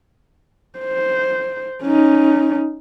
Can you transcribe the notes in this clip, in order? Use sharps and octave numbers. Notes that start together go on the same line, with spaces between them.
C5
C#4 D#4